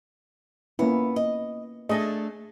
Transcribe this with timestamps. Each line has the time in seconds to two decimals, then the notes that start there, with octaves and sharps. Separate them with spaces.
0.79 A#3 B3 C#4 E4
1.16 D#5
1.89 A3 D4 G#4 A4 D#5